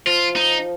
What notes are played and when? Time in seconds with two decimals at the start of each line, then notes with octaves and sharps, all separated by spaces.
0.06 F3 F4
0.36 D#4